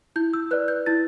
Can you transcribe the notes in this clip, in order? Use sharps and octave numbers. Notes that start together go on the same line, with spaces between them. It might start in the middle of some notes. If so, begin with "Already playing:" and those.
E4 G6
E6
B4 D5 F#6
G6
E4 A6